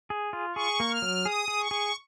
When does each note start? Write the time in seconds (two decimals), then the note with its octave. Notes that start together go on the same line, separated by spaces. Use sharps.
0.10 G#4
0.33 F4
0.56 G#4 C#6
0.80 A#3
0.91 F6
1.02 F#3
1.25 G#4 D#6
1.48 G#4
1.60 C#6
1.71 G#4